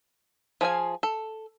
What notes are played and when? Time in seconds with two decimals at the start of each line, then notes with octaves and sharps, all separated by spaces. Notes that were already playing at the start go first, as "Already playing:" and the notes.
0.61 F3 G#4 F5 G#5
1.03 A4